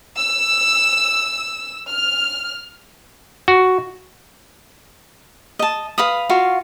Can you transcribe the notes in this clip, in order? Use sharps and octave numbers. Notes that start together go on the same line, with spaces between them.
E6
F6
F#4
D#5 A5
B4 F5 B5 D#6
F4 F#4 F5